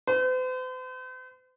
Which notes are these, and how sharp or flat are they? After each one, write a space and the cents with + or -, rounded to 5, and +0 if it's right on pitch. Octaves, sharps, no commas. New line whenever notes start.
C5 -45